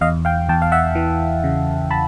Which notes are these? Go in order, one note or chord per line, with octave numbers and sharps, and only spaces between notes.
E2 D#5 F5
F5 G5
E2 G5 A5
F5
E5 F#5
E3
C#3
A5 B5